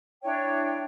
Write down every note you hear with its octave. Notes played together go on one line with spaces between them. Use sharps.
D4 E4 C#5 G5